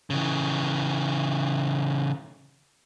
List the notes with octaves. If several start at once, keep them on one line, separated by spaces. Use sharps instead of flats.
C#3 E3